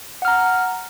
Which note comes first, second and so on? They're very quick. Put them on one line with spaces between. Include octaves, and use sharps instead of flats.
F#5 F6 A#5